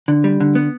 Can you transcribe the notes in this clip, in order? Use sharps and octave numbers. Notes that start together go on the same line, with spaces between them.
D3
G3
D3
B3